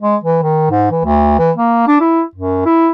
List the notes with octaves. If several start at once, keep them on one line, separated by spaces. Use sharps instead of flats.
G#3
E3
D#3
G#2
E3
D2
E3
A#3
D4
E4
F#2
E4